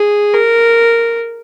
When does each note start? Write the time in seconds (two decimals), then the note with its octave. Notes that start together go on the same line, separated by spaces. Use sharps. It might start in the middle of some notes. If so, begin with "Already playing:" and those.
Already playing: G#4
0.33 A#4